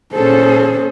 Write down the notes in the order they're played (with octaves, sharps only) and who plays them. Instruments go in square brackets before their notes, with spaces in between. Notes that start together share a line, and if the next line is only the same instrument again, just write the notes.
[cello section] A#2 G#4 A4 [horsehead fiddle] C#4 C5